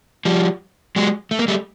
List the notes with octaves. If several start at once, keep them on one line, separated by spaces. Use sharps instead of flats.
F3 G3
F#3 G#3
A3
A#3
G3 A3